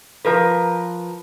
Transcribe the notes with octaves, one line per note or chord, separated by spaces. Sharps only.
F3 A#4 B4